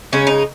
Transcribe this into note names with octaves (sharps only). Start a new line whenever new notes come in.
C#3 G#3 C#4
D#4